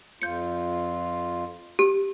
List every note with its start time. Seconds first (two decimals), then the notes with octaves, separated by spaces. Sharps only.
0.22 F2 F4 G6 C#7
1.79 G4